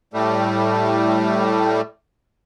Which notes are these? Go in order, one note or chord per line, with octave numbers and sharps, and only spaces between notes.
A2 G3 A3